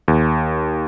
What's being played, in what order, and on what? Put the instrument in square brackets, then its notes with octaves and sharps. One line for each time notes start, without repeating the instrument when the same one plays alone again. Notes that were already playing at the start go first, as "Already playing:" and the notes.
[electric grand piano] D#2